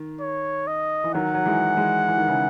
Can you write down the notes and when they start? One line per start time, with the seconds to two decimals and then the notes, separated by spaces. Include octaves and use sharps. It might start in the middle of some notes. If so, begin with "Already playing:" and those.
Already playing: D#3
0.20 C#5
0.67 D#5
1.04 E3
1.14 D#3 F#3 F#5
1.34 F#3
1.46 E3 G#3
1.77 E3 G#3
2.08 E3
2.18 D#3
2.28 C#3 E3